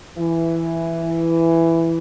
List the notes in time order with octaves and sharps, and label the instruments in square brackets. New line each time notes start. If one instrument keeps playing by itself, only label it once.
[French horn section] E3